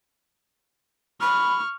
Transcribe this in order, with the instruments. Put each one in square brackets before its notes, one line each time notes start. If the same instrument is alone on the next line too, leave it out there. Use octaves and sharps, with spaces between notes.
[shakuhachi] B5 [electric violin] C#6 F6